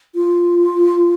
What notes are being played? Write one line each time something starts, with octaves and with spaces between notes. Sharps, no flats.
F4